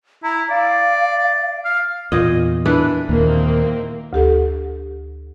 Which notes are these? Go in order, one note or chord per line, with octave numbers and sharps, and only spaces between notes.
E4 A#5
D5 F5
F5
E2 A#2 D#5
E3 D4 B4
D#2 A#2 D#3 A#3 C4
D2 G4 A4